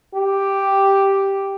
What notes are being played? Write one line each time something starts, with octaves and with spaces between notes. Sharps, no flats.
G4